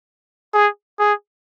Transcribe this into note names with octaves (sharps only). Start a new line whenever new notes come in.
G#4
G#4